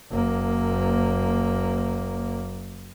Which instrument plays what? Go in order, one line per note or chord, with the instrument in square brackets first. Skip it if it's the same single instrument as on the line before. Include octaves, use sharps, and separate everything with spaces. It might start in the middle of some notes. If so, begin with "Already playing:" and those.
[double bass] F#1 A#3